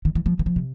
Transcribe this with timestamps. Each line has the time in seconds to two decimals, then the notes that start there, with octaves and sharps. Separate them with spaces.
0.05 D#3
0.15 E3
0.26 F3
0.39 E3
0.46 F3
0.56 C3